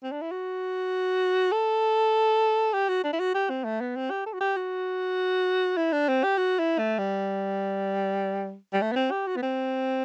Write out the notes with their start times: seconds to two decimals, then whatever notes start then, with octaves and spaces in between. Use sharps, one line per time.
0.03 C4
0.12 D4
0.21 E4
0.31 F#4
1.52 A4
2.73 G4
2.89 F#4
3.04 D4
3.13 E4
3.20 F#4
3.34 G4
3.50 C4
3.64 A3
3.81 B3
3.96 C4
4.10 G4
4.26 A4
4.33 F#4
4.40 G4
4.57 F#4
5.77 E4
5.92 D4
6.08 C4
6.24 G4
6.38 F#4
6.59 E4
6.79 A3
6.98 G3
8.73 G3
8.82 A3
8.92 B3
8.96 C4
9.11 G4
9.27 F#4
9.36 B3
9.43 C4